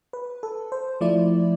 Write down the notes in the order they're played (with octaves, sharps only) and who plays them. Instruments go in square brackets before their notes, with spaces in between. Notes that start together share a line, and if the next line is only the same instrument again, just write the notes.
[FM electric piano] B4
A4
C5
F3 A3 E4 D5